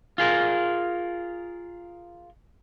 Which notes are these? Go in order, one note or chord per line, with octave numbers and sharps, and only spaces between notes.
F4 G#4 A#4